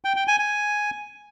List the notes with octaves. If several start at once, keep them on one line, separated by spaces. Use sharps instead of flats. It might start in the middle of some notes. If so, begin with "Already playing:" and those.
G5
G5
G#5
G#5